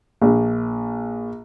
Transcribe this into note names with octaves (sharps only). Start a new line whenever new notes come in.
A#1